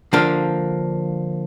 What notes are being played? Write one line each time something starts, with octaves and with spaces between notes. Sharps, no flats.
D3 F3 A#3 D4